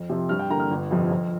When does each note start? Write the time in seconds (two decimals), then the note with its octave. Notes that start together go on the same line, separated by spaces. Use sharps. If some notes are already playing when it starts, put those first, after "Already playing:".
Already playing: F2
0.09 C3 F3 C4
0.29 G2 F6
0.39 G5
0.50 D3 A#3 A#5
0.60 F6
0.71 G1
0.91 F2 C3 F3
1.11 F2